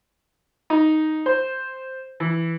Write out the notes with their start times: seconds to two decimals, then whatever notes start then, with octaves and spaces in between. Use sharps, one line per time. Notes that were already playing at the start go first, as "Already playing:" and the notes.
0.70 D#4
1.26 C5
2.20 E3